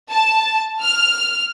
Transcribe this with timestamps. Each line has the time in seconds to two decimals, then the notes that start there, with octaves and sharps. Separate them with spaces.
0.11 A5
0.81 F6